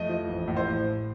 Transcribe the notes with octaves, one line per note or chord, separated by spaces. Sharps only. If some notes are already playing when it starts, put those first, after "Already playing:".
Already playing: F2 A3 D#5
F3
A1
A2
C5